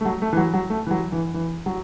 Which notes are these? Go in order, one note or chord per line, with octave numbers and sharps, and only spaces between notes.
A3
F#3
A3
E3
F#3
F#3
A3
E3
F#3
E3
E3
F#3